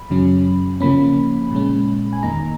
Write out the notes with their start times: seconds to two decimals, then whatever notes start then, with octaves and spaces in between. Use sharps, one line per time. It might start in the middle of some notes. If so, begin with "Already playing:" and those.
Already playing: B5
0.10 F#2 C#3 F#3 C#4
0.80 C#3 F3 A#3 C#4 B5
1.51 A#2 G#3 C#4
2.13 G#5
2.23 F2 D#3 A#3 D#4 A#5